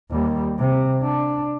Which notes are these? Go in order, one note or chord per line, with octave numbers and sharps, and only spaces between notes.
D#2 G3
C3
D4